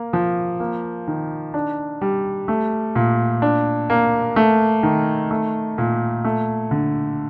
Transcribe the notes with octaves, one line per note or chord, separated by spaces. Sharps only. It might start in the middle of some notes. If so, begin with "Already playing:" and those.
Already playing: A#3
F3
A#3
D#3
D4
G3
A3
A#2
D4
A#3
A3
D#3
A3
A#2
A3
D3